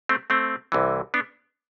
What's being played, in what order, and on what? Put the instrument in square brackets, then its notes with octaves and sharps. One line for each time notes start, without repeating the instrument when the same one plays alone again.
[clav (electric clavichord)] A3 C4
A3 C4
C2 C3 E3
B3 D4